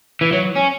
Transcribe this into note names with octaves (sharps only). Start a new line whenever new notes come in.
E3
F#3
C#4